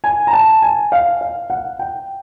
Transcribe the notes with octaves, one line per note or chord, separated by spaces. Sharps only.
G#5
A#5
A5
G#5
F5
F5
F#5
G5